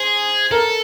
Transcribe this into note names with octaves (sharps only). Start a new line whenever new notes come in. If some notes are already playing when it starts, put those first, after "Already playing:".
Already playing: G#4 C5
A4 A#4